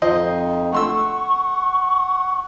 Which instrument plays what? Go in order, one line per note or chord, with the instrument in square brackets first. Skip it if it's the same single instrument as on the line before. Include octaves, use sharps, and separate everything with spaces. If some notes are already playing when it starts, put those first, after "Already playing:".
[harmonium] F2 D#4 [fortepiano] F3 C5 D#5
[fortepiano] A3 C6 E6 [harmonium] F#5 [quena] C#6